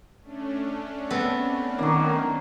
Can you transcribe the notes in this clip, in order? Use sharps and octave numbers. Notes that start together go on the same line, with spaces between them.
A3 C#4 D4
B3 C4 A4
D#3 F#3 A#3